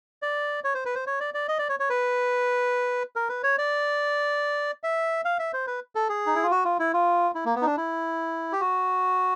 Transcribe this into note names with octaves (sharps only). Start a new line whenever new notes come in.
D5
C#5
C5
B4
C5
C#5
D5
D5
D#5
D5
C#5
C#5
B4
A#4
B4
C#5
D5
E5
F5
E5
C5
B4
A4
G#4
D#4
E4
F4
F#4
F4
E4
F4
E4
A#3
B3
D#4
D4
E4
G4
F#4